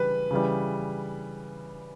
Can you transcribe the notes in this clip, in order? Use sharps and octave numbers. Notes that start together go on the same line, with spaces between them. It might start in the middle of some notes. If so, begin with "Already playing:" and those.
Already playing: C#3 E3 G3 B4
C#3 E3 G3